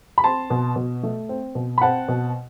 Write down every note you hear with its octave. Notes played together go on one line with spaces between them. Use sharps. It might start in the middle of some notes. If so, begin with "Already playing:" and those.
B5
C4 A5 C6
B2
B2
A3
C4
B2
B5
C4 F#5 A5
B2